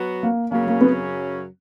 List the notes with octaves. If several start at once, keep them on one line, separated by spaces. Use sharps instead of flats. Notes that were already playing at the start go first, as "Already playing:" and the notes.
Already playing: F#3 B3 F#4
A#3
F#2 C#3 F#3 A#3 C#4
A#3
B3